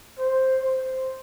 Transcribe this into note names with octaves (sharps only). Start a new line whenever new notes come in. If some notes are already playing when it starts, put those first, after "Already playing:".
C5
C5